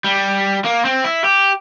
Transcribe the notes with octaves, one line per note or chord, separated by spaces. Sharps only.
G3
A#3
C4
E4
G4